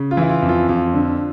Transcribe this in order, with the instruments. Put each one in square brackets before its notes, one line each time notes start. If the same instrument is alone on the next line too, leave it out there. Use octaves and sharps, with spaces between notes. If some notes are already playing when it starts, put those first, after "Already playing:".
Already playing: [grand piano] C#3
F4
E3 E4
F4
F2
F4
F2 F4
D3